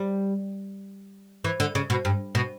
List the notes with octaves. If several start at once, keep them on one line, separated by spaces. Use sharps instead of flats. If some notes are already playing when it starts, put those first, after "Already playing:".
Already playing: G3
E3
D3
C#3
B2
G2
B2